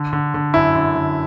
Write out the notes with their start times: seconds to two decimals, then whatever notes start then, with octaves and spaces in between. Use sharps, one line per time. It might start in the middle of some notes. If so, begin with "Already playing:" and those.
Already playing: D3
0.13 D3
0.34 D3
0.54 F#2 E4
0.75 D3
0.96 D3